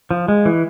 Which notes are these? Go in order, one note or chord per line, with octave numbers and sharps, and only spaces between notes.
F3
G#3
E3